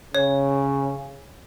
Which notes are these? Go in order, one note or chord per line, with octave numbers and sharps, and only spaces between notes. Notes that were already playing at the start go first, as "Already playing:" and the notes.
C#3 C#5